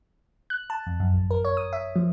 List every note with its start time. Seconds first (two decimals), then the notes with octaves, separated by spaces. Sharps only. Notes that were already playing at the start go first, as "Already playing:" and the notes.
0.50 F#6
0.70 A5
0.86 F2
1.00 F#2
1.14 A1
1.31 A#4
1.45 C#5
1.57 D#6
1.73 E5
1.96 F3